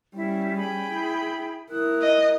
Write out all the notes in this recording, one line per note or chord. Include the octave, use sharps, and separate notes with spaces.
G3 C#4 E4
G#4 G5 B5
E4
E4 A#4 D#6 F#6
D#5